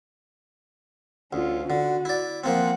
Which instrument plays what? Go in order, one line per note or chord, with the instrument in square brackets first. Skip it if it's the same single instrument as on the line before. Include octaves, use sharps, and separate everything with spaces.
[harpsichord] D2 [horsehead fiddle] C#4 F4
[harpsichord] D3 [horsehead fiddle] F#4
[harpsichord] E4 D5
[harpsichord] F3 A#3 C4 [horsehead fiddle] F#5